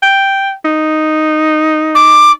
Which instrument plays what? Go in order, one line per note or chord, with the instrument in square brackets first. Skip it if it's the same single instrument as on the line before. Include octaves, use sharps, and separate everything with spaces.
[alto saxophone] G5
D#4
[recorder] D6